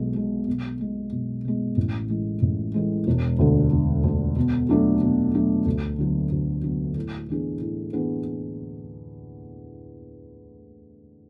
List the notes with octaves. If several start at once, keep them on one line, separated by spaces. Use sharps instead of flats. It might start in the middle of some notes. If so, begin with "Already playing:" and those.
Already playing: B1 B2 G#3
B2 G#3
B1
B2 G#3
B1
B2 G#3
A1
A2 E3 G#3
A1
A2 E3 G#3
E1
D2 D3
E1
D2 D3
B2
F#3 A3 D4 A4
B2
F#3 A3 D4 A4
D2
D3 F#3 B3
D2
D3 F#3 B3
A2
E3 B3 D4 G#4
A2
E3 B3 D4 G#4